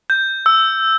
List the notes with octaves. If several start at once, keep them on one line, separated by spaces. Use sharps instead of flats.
G6
E6